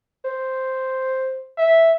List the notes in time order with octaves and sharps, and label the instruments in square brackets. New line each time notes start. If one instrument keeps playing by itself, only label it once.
[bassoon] C5
[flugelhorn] E5